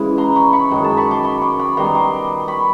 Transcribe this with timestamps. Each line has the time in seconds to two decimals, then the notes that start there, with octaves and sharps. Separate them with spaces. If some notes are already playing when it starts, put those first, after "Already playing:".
Already playing: C#3 E3 G#3
0.18 A#5 C6
0.36 B5 C#6
0.53 B5 C#6
0.70 F#2 D#3 G#3 A#5 C6
0.84 A5 B5
0.97 B5 C#6
1.11 C6 D6
1.24 B5 C#6
1.41 C6 D6
1.59 B5 C#6
1.77 D#3 G3 B3 A#5 C6
1.95 C6 D6
2.48 B5 C#6